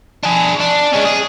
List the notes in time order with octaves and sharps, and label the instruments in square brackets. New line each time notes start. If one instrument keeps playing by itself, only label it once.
[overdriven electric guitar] D4 G#4
D4
G#3 C#4
G#4